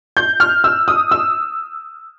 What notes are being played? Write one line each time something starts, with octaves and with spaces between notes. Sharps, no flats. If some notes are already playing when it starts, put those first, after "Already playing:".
G6
F6
E6
D#6
E6